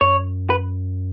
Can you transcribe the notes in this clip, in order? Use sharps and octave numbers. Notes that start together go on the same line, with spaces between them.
F#2 C#5
B4